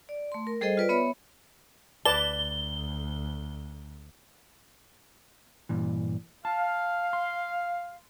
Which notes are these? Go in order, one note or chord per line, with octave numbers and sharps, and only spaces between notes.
D5
A3 C6
A#4
G3 G#4 A4 C5 D#5 G5
F4 B4 D5
B3 C#5 E5 B5
D2 B4 D5 A5 G7
G2 A#2 E3
F5 A5
C6